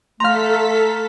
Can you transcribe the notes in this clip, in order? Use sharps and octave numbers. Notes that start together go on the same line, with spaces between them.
A3 A4 F5 A#5 C6 F6 B6